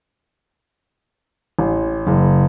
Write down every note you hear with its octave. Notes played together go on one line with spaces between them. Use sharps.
A1
F#1